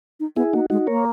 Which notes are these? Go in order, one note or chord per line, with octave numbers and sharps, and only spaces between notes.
D#4
B3 E4 G#4
A#3 D#4 F#4
G#3 D#4 F#4
A#3 A#4 C#5